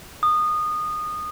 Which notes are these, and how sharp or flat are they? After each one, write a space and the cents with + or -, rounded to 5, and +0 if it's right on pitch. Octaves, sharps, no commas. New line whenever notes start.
D#6 -20